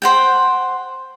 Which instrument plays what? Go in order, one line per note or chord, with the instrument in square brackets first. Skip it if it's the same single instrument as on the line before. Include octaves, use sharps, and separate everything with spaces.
[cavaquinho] C5 F#5 G5